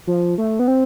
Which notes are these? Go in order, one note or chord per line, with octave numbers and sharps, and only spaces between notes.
F3
A3
B3
C4